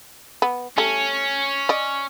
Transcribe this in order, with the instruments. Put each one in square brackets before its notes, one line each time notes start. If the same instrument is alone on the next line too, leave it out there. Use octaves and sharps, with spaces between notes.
[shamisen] B3
[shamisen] G3 A3 [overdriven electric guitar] C#4
[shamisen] D5 D#5